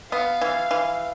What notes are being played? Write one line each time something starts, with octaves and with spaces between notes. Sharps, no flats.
B3 F5
E3
E3